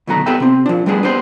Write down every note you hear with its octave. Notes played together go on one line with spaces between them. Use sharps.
D2 B2 D#3 F#3 A3 A#5
B3 G4 A4 B4 E5 G5
C3 C4
F3 D4
G3 A3 B3 D4 G#4
B3 D4 G4 C5